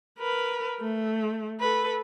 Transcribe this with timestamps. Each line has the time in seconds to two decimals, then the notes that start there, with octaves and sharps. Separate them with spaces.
0.18 A#4 B4
0.80 A3
1.60 A4 B4